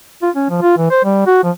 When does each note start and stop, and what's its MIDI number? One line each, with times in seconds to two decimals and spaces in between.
0.22 0.30 65
0.35 0.46 61
0.50 0.61 53
0.62 0.73 65
0.78 0.90 52
0.91 1.03 72
1.05 1.22 55
1.27 1.42 66
1.44 1.51 53